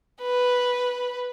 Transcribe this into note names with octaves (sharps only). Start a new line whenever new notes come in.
B4